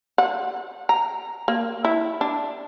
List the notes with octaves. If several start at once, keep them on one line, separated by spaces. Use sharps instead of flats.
F#5
A#5
A#3
E4
D4